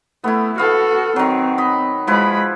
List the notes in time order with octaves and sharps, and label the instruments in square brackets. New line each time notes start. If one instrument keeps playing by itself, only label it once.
[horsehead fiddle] A3 [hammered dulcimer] B3 E4
[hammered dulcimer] B3 F5 [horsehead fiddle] F#4 A4
[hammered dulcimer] D#3 F#3 [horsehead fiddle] C4
[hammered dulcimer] D#5 B5
[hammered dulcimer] F3 E4 B4 [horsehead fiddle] G#3 B5